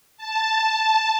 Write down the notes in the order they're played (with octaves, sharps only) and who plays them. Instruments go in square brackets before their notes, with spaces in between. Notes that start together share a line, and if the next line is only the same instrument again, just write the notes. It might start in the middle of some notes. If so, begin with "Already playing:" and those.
[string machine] A5